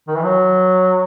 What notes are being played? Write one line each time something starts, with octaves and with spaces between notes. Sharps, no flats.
D#3
E3
F#3